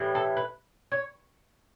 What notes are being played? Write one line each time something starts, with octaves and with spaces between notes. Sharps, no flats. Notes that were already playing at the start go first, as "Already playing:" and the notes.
Already playing: A2 E3 G3
A4
B4
C#5